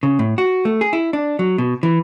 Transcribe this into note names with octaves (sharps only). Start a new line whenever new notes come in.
C#3
A2
F#4
A3
G#4
E4
D4
F#3
B2
E3